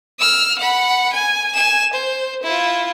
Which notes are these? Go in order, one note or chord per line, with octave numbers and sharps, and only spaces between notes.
E6 F6
F#5 B5
G#5
G#5 E7
C5
E4 F4